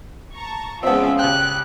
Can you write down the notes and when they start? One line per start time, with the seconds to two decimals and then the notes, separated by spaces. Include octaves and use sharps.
0.34 A5 A#5 C#6
0.83 E2 C#3 F3 G#3 B3 C4 F4 E5
1.19 C#2 G4 G5 F#6